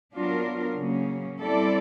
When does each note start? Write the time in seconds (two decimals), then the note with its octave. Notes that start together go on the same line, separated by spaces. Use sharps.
0.15 F#3 B3 D4 F4 A#4
0.77 C#3 F#3 A#3 C#4
1.41 G3 C4 E4 A4 D5